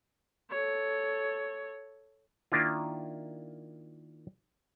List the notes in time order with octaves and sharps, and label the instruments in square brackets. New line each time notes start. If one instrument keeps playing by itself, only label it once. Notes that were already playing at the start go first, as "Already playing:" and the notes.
[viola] A4 C#5
[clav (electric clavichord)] D#3 A#3 D4 E4 F4